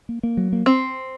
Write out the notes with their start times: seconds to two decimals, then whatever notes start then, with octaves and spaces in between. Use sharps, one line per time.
0.09 A#3
0.23 A#3
0.37 F#3
0.53 A#3
0.66 C4